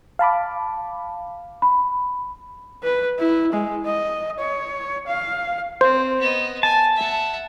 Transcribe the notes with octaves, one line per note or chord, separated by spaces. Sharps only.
F5 A5 B5 D6
B5
B4
E4
G#3
D#5
C#5
F5
C4 C5
B3 D#5
G#5 A5
E5 F#5